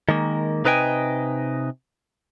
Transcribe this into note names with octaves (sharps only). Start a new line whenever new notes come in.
D#3 G#3 A#3
C3 D#4 B4 D#5 G5 G#5